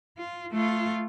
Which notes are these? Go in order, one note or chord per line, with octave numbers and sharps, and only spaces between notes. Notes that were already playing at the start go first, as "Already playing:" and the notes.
F4
A3 F4